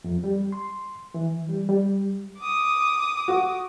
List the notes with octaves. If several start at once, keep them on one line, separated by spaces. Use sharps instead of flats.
F2
G3
C6
E3
G3
G3
D6 D#6
F#4